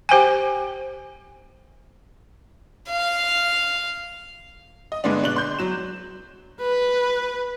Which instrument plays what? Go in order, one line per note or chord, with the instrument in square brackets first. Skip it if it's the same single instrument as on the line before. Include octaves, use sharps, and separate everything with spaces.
[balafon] G4 C5 G5 G#5
[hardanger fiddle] F5
[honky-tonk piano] D#5
G2 D3 G#3 B3 D4
B2 D4 F#6 F#7
C6 G6
F#3 E7
[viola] B4